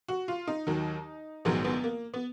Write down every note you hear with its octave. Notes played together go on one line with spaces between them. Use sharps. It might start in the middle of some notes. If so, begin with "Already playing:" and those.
F#4
F4
D#4
D#2 D#3 F#3
A#1 G#2 D#3 F#3 B3
B3
A#3
B3